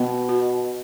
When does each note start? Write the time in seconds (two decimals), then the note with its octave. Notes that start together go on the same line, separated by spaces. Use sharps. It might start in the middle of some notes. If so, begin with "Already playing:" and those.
Already playing: B2 B3
0.29 F#4